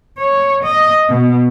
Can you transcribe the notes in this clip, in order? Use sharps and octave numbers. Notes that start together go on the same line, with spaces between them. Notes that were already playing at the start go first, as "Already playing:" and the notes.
C#5
D#5
B2